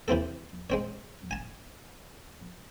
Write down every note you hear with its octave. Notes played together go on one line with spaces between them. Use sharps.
C3 E3 C4 A4
G#3 C4 C#5
G#5 A5